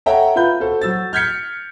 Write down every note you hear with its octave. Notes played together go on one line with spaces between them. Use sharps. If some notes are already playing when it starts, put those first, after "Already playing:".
A4 C#5 E5 F#5 G5 A#5
F4 B4 B5 G6
F#4 A4 C5
F#3 E6 A6
F6 G6 G#6 B6 C#7